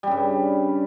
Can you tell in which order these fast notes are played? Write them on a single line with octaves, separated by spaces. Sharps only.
G3 C#3 G2